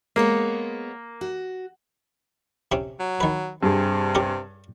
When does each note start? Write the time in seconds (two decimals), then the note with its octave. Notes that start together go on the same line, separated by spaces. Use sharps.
0.16 G#3 A#3 B3 C#5
1.21 F#4
2.72 C3 C4 C#4
3.00 F#3
3.20 D#3 B4
3.63 G2 C3 G#4
4.15 C#4 G4 A#4